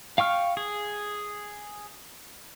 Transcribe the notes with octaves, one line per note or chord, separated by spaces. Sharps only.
F5 G5 C#6 F6
G#4